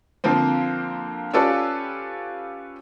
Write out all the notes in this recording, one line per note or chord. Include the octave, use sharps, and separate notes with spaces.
D3 F3 A#3 C4
C#4 F4 G4 A4 B4 D5